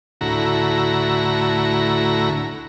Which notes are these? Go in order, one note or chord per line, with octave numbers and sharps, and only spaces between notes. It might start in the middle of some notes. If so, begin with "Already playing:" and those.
D2 A2 E4 F#4 A#5